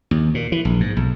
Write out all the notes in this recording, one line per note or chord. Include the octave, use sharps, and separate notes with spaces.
D#2
A#2
E3
A#1
G#2
B1